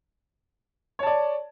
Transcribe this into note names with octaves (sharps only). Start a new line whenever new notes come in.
C#5 D5 A5